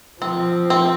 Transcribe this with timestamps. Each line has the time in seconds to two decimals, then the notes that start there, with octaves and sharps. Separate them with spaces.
0.22 F3 C4
0.70 C4